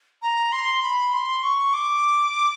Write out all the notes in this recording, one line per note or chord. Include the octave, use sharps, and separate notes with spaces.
A#5
C6
B5
C6
C#6
D6